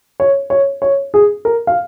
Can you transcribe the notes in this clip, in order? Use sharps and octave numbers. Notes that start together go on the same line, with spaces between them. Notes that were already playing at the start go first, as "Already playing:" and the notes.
C#5
C#5
C#5
G#4
A#4
F5